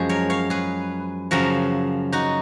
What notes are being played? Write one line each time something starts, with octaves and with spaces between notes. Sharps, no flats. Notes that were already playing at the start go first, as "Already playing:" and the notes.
Already playing: F#2 F3 G#3 F#4 G#4
A#4 C#5
C#5 F5
G#4 B4
F#2 C#3 F3 F#4 A#4
D#4 F#4